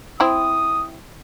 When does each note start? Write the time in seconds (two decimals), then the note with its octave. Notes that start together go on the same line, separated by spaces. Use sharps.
0.20 C4 E4 D#6